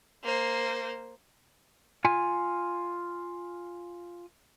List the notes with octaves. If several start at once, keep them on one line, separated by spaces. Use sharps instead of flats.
A#3 C5
F4 G#5